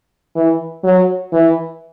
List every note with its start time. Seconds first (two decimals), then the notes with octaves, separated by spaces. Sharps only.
0.36 E3
0.84 F#3
1.33 E3